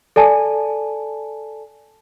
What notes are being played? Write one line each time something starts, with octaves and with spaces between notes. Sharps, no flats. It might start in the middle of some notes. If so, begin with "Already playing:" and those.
A4 D5 G#5 A5